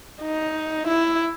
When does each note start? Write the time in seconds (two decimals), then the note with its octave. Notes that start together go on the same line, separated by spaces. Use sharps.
0.22 D#4
0.88 E4